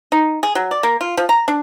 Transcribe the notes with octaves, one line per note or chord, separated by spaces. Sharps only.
D#4
G#4
F#3
D5
A#3
F4
F3
A#5
D4